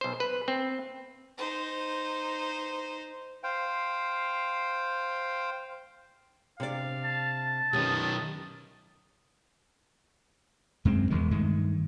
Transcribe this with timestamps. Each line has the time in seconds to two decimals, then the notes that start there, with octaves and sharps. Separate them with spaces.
0.01 B1 C5
0.20 B4
0.48 C4
1.38 D#4 C5
3.44 C5 F5 G5
6.60 C3 D4 D5 F5
7.04 A5
7.73 B1 D#3 C#4 G4 D#6
10.85 F#2 G#3 C4
11.10 B1 E2 D#3 G#3
11.31 G2 D#3 G#3 A3